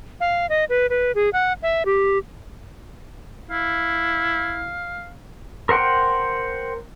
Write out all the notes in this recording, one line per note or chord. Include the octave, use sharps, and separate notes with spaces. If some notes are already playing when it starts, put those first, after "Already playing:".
F5
D#5
B4
B4
G#4
F#5
E5
G4
E4 F5
A#4 C5 F#5 G5